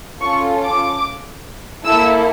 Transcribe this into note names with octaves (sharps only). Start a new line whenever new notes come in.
C#4 F4 A4 C#6
D6
A#3 E4 A4 E6